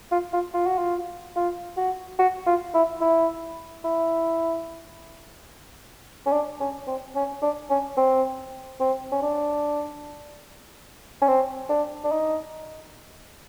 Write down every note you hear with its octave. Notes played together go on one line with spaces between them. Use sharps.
F4
F4
F4
F#4
F4
F4
F#4
F#4
F4
E4
E4
E4
C#4
D4
C#4
C4
C#4
D4
C#4
C4
C4
C#4
D4
C#4
C4
D4
D4
D#4